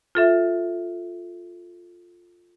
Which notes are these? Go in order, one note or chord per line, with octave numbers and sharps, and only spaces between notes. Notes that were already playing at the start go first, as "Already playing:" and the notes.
F4 A4 E5